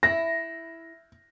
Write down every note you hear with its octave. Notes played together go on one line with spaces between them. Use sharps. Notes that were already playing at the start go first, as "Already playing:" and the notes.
E4 A#6